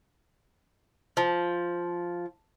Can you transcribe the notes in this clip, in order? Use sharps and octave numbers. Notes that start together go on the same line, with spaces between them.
F3